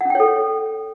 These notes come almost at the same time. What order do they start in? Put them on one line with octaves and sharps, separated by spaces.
F#5 C#4 G5 C#5 A4